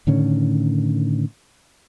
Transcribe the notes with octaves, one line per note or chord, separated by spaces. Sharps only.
A2 D3 D#3 C#4